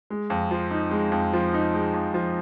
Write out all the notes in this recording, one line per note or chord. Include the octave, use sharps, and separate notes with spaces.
G#3
F2
F3
D#4
G#3
F2
F3
D#4
G#3
F2
F3